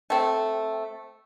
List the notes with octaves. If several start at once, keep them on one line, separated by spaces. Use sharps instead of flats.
A3 C4